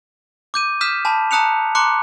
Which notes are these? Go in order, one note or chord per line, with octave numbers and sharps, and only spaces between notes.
D6 G6 D#7
D#6 F6 G6 B6 E7
G#5 A5 B5
A5 A#5 D#6 F#6 C#7 F7
A#5 C6 D6 F#6 C#7